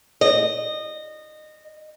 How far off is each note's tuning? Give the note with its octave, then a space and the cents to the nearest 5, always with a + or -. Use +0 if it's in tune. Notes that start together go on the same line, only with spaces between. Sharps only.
D#5 -20